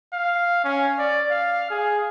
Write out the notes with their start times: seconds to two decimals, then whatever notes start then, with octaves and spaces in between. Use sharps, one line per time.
0.13 F5
0.64 C#4
0.99 D5
1.30 F5
1.70 G#4